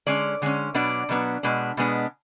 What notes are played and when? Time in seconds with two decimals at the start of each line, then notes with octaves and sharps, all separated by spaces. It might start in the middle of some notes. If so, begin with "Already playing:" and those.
0.06 D3 G#3 C#4 D5
0.42 D3 G#3 C#4
0.74 B2 F#3 B3 D4 D5
1.09 B2 F#3 B3 D4
1.43 B2 G#3 B3 D4
1.77 B2 G#3 B3 D4